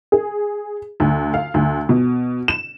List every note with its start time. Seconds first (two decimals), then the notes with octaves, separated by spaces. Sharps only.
0.12 G#4
1.00 D2
1.34 F5
1.54 D2
1.89 B2
2.48 E7